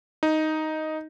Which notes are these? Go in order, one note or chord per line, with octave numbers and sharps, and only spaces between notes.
D#4